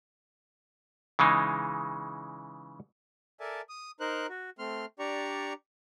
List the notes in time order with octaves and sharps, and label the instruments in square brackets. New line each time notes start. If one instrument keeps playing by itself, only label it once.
[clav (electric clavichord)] C#3 E3 G#3 D#4
[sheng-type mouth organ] A4 A#4 D5 E5 G#5 A5
D#6
D#4 A#4 C5 F#6
F#4
A3 C4 C6 F6
D4 G4 D5 A#5 C#6